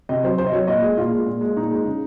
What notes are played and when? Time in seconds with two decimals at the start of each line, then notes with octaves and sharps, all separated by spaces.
0.09 C3 D#5
0.23 F#3 C5
0.38 C3 C5
0.47 D#5
0.53 F#3 C#5
0.68 A#2 D#5
0.82 G#3
0.97 A#2 F4
1.12 G#3
1.27 A#2
1.41 G#3
1.57 A#2 D#4
1.71 G#3
1.85 C#3